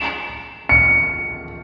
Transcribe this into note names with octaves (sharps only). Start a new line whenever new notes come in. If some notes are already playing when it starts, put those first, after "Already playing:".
Already playing: E7
C#7